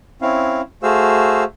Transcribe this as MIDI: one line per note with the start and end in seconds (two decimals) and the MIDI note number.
0.22 0.61 60
0.22 0.61 61
0.22 0.61 64
0.22 0.61 77
0.83 1.44 57
0.83 1.44 66
0.83 1.44 68
0.83 1.44 72
0.83 1.44 77
0.83 1.44 88